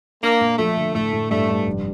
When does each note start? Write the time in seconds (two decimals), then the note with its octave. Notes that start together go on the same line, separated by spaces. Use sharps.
0.23 A#3 D4
0.41 A#2
0.58 F3 A3
0.77 D3
0.95 A2 A3
1.13 A2
1.31 G2 A3
1.49 G2
1.67 F1